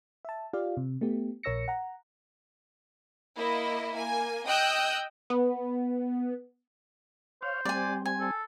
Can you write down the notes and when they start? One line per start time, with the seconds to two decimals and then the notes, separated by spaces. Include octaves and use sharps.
0.25 E5 A5
0.53 F4 G4 D5 F5
0.77 C3
1.01 A3 B3 G4
1.43 A#1 A#4 C#5 E6 A#6 C#7
1.68 F#5 A#5
3.36 A#3 E4 D#5
3.94 A#3 G#5
4.48 D#5 G5 D#6 E6 F#6 G6
5.30 B3
7.42 C5 C#5 F5
7.65 G3 C4 D5 G#5
8.06 G#5
8.20 A4